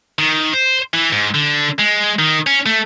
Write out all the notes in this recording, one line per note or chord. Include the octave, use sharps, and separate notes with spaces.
D#3
C5
E3
G#2
D3
G#3
D#3
C#4
A3